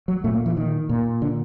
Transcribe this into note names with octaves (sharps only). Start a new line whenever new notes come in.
F#3
A#2 A3
A#3
E3
D#3
A#2
D3